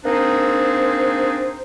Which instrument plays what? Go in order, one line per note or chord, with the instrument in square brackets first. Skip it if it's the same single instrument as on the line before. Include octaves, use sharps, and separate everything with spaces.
[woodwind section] A#3 C4 D4 D#4 G#4 C5